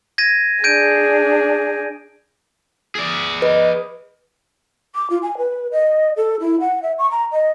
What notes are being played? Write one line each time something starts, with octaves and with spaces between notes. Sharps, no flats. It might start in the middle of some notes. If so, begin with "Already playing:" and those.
G#6 A#6 D#7
D4 G#4 G6 D7 D#7
G#4 D5
B4 D#5
D6
F4
G#5
B4
D#5
A4
E4
F#5
E5
C#6
A#5
D#5